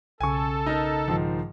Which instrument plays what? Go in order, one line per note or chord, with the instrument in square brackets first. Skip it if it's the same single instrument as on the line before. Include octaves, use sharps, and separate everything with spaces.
[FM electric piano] B1 C#3 [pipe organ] A4 [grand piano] G#5 C#6
[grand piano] D#4 A#4
G#2 D#3 F3